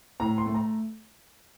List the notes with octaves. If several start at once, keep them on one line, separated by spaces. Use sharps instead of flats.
A2 A#5
C6
A3
A#5